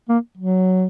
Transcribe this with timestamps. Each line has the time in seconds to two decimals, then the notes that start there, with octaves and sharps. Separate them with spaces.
0.09 A#3
0.37 F#3